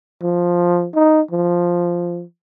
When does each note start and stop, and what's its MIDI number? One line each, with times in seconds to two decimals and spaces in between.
0.22 0.88 53
0.95 1.21 63
1.31 2.23 53